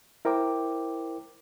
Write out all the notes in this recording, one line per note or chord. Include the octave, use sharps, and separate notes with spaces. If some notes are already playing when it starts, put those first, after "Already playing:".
E4 A#4 C5 G5 D6